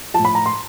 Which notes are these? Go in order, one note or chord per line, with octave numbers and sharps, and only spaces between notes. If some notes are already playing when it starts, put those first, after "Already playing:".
F3 A5
A2
B5
A#5
C6